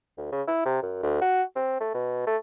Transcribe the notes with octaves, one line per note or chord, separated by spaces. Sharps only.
D2
C#3
E4
C3
F#2
D2
F#4
C4
A3
B2
A3